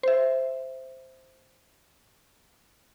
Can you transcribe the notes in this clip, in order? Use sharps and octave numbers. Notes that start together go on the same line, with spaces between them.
C5 E5